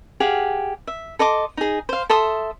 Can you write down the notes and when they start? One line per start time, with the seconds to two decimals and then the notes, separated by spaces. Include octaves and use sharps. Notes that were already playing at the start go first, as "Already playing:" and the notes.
0.20 G4 G#4 F5 F#5
0.87 E5
1.19 A4 D#5 C6 D6
1.57 D#4 G#4
1.89 C5 F5
2.10 A4 E5 C6 D#6